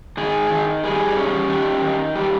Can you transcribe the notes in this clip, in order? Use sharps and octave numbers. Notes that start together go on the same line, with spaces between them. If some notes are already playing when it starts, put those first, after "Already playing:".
D#3 G#4
D#3
G3 G#4
C#4
D#3 G4
D#3
G3 G4